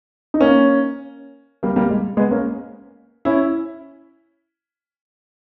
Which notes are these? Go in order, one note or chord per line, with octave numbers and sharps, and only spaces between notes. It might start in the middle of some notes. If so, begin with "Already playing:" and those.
D#4
A#3 C#4
G3 A#3
G3 A#3
G#3
G#3 B3
A#3 C#4
C#4 E4